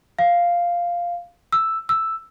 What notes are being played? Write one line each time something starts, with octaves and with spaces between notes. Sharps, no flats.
F5
E6
E6